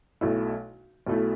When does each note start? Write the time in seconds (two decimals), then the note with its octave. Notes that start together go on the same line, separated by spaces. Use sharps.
0.21 B1 B2 A3 E4
1.06 B1 B2 A3 E4